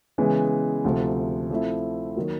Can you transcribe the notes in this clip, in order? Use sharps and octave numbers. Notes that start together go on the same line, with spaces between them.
C#3 E3 G#3 B3
D2 C3 F3 A3
F3 A3 C4 E4
D#3 F#3 A#3